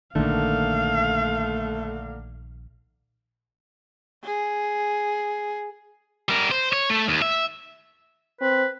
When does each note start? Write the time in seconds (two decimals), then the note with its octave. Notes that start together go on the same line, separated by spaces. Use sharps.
0.16 A#1 D3 D#3 A3 A#3 F5
4.24 G#4
6.29 G3 A#4
6.51 C5
6.73 C#5
6.90 A3
7.08 D#2
7.22 E5
8.41 C4 B4